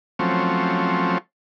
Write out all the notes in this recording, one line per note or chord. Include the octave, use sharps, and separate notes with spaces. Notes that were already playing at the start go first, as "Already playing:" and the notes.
F3 F#3 A3 C4 C#4